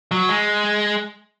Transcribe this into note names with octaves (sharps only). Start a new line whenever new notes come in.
F#3
G#3